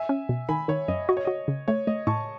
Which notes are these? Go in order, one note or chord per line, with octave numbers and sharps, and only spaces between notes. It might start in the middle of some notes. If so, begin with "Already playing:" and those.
Already playing: E5 G#5
C#4
B2
D#3 G#5 B5
D#3 C#5
F#2 D#5
F#4 D#5
C#5
F#4 D#5
C#3
A3 C#5
A3 D#5
A2 A5 C#6